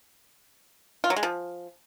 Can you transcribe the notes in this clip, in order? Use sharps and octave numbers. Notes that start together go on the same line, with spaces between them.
F4
F#3
G#3
F3